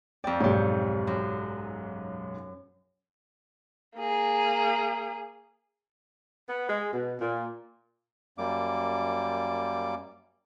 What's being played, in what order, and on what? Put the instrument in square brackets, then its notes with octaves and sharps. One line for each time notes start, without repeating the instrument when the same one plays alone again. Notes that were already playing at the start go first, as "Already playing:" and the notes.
[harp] F2 D5 [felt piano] G5
[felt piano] B1 G#2 [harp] G4 C#5
[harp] F#2
[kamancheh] A#3 G#4
[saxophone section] B3
G#3
B2
A#2
[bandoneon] F#2 G3 A#3 D6